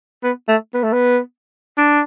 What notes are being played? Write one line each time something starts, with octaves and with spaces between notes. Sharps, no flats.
B3
A3
B3
A3
B3
D4